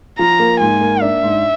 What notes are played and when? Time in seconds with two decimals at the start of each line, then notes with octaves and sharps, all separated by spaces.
0.19 F3 A#5
0.39 A#3
0.60 G#2 G#5
0.81 A#3
1.02 D4 E5
1.23 G#2